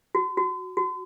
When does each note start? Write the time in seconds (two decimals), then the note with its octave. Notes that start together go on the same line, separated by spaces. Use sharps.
0.15 F#4
0.37 F#4
0.77 F#4